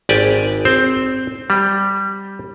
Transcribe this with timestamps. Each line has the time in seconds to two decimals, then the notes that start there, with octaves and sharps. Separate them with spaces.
0.09 G#1 G4 D5 G#5
0.65 C4 C5
1.50 G3